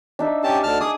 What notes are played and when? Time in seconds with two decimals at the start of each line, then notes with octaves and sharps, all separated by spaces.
0.19 D4 D#4 E5
0.44 C#4 G4 A5
0.63 D2 A5 F6
0.81 G#4 D6 D#6